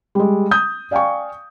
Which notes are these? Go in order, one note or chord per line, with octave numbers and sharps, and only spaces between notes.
G3 G#3
D#6 G6
D5 F5 G5 G#5 C#6